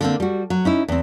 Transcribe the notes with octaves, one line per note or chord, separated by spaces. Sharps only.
D3 A#3 C4
G3 F#4
F#3
C#4 D#4 E4
E2 C4